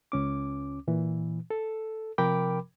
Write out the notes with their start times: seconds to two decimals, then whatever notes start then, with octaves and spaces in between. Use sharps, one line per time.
0.12 C#2 C#4 D6
0.88 A#2 E3
1.50 A4
2.18 C3 F3 A#4 G5 B5 D6